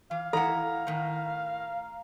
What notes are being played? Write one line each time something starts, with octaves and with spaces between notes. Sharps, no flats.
E3 F5
E3 E4 A4 F#5 A#5
A2 D#3